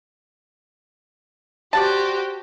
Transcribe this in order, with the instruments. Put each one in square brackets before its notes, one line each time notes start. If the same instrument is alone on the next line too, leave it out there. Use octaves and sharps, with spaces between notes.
[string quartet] F#4 G4 C5 [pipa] D5 F#5 A5